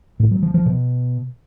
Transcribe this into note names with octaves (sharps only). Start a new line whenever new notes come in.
A2
F#3
F3
F3
B2